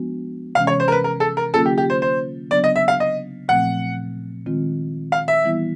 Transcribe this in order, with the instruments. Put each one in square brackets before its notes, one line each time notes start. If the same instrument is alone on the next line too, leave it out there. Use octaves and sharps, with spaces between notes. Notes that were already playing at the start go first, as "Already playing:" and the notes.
Already playing: [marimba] F3 G#3 B3 D4 F#4
[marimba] C3 E3 G#3 C#4 [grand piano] F5
[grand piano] C#5
C5
A#4
B4
A#4
A4
A#4
[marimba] D3 F#3 A#3 C#4 F4 [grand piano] A4
[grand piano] G4
G4
C5
C5
[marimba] C#3 F#3 B3 D4 [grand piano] D5
[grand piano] D#5
E5
F5
D#5
[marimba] A#2 F3 A3 C4 [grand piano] F#5
[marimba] D#3 G#3 C4 F4
[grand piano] F5
E5
[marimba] E3 G3 B3 E4